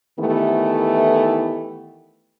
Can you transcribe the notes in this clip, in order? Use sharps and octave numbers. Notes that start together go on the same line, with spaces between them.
D#3 E3 A3 B3 E4 G4